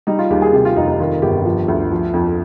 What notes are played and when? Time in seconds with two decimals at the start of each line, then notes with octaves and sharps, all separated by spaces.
0.07 G3 D#4
0.19 F4
0.30 D#2 G4
0.42 G#4
0.53 C3 G4
0.65 F4
0.76 F1 D#4
0.88 D#4
1.00 D#3 F4
1.22 G1 G4
1.45 F3
1.68 D2
1.91 F3
2.14 F2